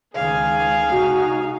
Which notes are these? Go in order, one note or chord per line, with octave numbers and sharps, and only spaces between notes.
C#2 D#3 G#4 F5 G#5
C3 D#4 F#4